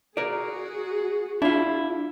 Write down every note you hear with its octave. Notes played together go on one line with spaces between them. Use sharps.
F#4 G#4 A#4 D5
D4 E4 F4